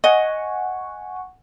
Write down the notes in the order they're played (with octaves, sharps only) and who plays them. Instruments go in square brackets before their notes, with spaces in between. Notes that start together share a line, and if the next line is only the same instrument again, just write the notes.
[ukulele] D#5 [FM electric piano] F#5 G#5 C#6